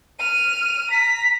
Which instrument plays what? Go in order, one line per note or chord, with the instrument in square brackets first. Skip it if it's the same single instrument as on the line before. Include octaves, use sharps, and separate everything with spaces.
[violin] F6 D#7
[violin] A#5 [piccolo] B6